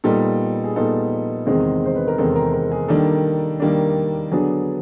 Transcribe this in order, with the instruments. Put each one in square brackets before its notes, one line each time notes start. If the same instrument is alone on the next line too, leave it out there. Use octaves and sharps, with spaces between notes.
[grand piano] A#2 G3 B3 D#4 A4
G#4
A#2 G3 B3 D#4 A4
E2 C3 D#3 G#3 C4 G#4
C5
B4
A#4
E2 C3 D#3 G#3 C4 A4
A#4
A#4
G#4
D#3 G3 A#3 D4 A4
D#3 G3 A#3 D4
D3 F#3 B3 D4 G#4